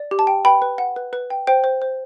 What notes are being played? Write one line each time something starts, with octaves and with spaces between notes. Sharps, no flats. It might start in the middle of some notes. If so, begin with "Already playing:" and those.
Already playing: D5
G4
A5
G5
B4 G5 B5
B4
F#5
B4
B4
G5
C5 G5
C5
C5